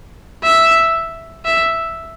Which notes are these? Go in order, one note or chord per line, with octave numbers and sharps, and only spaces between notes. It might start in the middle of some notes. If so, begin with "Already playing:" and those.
E5
E5